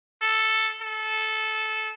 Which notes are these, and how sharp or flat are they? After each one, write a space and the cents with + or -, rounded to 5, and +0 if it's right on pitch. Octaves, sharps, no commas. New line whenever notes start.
A4 +0
A4 -15